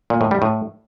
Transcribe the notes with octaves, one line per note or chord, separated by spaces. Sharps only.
A#2
A2
G3
A2